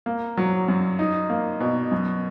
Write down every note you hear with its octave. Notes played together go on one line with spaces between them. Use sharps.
A#3
F#3
F#2
D#4
A#3
B2
F#2